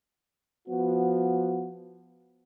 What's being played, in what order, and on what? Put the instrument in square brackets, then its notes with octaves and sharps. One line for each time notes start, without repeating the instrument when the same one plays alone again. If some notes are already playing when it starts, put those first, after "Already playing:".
[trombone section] F3 B3 F#4